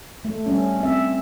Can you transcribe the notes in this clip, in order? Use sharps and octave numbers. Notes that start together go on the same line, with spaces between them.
A3
G3 C#4
C4 E5